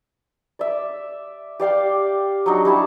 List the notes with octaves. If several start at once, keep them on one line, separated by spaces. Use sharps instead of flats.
D5 E5
G4 D5 F5 G5
F#3 D4 D#4 F#4
G3 E4 G4 A5